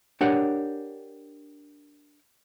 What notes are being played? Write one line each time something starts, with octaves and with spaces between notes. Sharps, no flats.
D4 G4 A#4 C#5 F#5